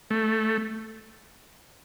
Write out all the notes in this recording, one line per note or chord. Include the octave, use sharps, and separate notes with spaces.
A3